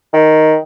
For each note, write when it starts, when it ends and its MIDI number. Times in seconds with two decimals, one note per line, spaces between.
0.14 0.56 51